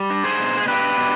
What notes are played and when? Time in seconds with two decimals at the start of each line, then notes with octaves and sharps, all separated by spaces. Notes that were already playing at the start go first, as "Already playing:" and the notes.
Already playing: G3
0.10 D4
0.24 G#4 C5
0.39 B2
0.57 G#4
0.68 D4 G4 B4
0.97 B2